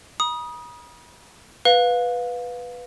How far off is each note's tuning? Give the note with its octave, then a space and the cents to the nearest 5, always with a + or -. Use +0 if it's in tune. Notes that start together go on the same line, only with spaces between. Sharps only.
B5 -45 D#6 +0
B4 +0 F5 +20